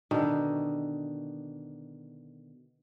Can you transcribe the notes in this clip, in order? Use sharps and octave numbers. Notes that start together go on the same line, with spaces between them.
B2 D3 D#3